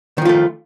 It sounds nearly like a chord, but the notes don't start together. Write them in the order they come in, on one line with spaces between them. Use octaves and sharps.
D#3 F3 F4 A3